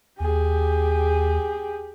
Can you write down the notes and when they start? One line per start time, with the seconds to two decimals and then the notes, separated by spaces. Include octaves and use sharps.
0.20 D#2 G4 G#4